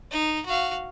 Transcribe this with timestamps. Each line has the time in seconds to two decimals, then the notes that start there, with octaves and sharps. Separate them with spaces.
0.11 D#4
0.46 F#4 F5